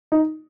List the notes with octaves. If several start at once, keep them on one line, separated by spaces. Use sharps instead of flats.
D#4